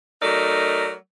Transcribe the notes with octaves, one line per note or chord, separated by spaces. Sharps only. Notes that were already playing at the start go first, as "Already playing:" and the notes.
F#3 A3 D#4 A#4 D5